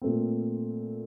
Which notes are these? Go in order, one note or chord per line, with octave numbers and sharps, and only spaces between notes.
A#2 A3 C4